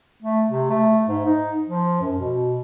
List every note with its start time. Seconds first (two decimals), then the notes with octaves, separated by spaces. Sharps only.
0.22 A3
0.49 C3
0.70 A3
1.08 G#2
1.25 D#4
1.69 F3
2.01 F#2
2.17 B2